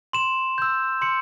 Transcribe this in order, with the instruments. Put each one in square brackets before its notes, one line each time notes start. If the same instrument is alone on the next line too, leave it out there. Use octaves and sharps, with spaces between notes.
[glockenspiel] C6 E7
E6 G6
C6 C#7